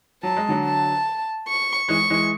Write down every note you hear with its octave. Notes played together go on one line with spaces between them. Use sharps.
F#3 A5
G#3
D3 F#3
A5
C#6
E3 G#3 C#6
E3 G#3